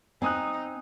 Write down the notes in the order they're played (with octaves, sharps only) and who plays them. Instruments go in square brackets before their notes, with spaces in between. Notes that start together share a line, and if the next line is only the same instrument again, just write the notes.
[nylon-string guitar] C4 [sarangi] D#4 [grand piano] G#5 D#6 F#6